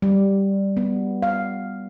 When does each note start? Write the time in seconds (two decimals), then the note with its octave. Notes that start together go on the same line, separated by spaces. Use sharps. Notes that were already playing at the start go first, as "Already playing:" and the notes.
0.02 G3
0.77 B3
1.22 F5